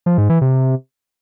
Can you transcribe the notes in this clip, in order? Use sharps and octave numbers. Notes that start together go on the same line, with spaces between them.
F3
G#2
E3
C3